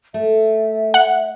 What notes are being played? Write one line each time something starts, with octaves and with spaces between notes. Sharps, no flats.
A3 E5
F#5